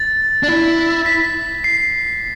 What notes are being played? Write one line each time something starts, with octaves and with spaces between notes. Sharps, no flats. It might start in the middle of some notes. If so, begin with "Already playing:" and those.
Already playing: A6
D4
E4
B6
C7